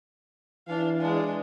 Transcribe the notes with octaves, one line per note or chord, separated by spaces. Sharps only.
E3 D4 F5
G#3 D4